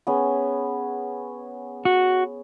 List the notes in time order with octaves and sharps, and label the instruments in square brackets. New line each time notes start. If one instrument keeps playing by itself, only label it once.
[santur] B3 C#4 G#4
[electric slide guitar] F#4